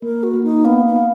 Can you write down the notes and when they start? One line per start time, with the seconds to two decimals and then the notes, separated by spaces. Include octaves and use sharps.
0.02 A#3 A#4
0.23 F#4
0.34 A#3
0.43 D#4
0.65 B3 F5
0.86 B3
0.96 F5